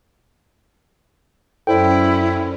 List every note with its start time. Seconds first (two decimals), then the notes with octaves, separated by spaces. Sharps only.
1.67 F#2 C#4 E4 A4 C5 D5 G5